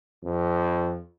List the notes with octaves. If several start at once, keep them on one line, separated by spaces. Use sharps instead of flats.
F2